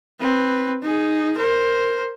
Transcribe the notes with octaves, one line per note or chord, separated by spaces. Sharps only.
C4 B4
D#4 G#4
A#4 C5